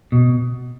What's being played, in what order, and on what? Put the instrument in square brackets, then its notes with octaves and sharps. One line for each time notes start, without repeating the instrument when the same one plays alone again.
[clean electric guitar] B2